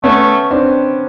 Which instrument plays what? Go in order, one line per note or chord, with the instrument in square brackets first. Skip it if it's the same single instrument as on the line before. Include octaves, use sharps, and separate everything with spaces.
[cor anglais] A3 [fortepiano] B3 C#4
[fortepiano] C4 D4